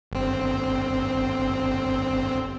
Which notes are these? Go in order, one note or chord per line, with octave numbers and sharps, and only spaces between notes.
G1 C4